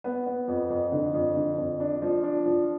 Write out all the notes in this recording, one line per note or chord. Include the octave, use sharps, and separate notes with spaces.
B3
B3
F2
F2
D3
F2
D3
F2
D4
F3
D4
F3